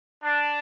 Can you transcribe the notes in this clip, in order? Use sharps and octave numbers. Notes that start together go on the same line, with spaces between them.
D4